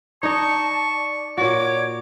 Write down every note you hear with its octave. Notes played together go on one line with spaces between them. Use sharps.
D#4 D5 D#5 A5 C#6
A#2 F#4 C#5 D6